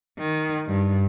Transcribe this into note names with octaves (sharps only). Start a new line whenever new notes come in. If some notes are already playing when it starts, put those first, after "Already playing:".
D#3
G2